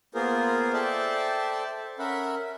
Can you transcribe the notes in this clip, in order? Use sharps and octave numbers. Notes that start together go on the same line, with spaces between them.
A#3 B3 F4 G#4 A#4 C5
A4 C5 D5 E5 G5 A5
C#4 A#4 E5 F#5 B5